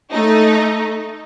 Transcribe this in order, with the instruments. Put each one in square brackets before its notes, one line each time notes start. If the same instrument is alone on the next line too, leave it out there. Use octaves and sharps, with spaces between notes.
[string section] A3 D#4